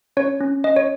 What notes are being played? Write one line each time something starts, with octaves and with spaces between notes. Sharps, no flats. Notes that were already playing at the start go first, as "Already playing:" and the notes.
C#4 C#5
C#4
C#4 D#5
C#5